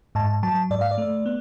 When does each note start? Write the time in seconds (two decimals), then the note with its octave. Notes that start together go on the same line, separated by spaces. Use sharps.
0.15 G#2 A5
0.43 F#3 A5
0.70 G#2 D5
0.81 F5
0.91 D5
0.98 A3
1.26 B3